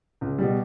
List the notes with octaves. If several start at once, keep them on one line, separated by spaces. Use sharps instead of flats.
C#2
B2 G3